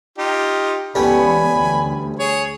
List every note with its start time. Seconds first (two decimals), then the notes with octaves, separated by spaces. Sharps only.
0.18 D#4 F4 G4
0.95 C#2 E3 G3 A3 B3 C#4 G#5 B5
1.57 D2
2.19 G#4 C#5